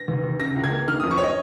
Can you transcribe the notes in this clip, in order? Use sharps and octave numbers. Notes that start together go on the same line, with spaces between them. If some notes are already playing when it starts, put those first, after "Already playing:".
Already playing: A#6
D#2
D#2
C#3 A#6
C#2
G#6
A#3
D#3 F6
F2 D#6
C#6
C#5
D#5